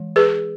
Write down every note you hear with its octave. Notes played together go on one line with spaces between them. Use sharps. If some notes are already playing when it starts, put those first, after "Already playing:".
Already playing: E3 G#3
G#4 B4